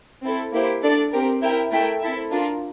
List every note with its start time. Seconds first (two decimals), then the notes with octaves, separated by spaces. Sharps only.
0.23 C4 E4 A4
0.53 A#3 E4 G4 C5
0.82 D4 A4 D5
1.12 C4 G4 A#4
1.42 E4 A#4 E5 G5
1.72 A3 E4 A#4 E5 G5
2.01 C4 E4 A4 E5
2.31 D4 F4 A#4